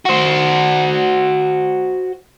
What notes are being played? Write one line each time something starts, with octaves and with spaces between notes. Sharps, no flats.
F#4 C5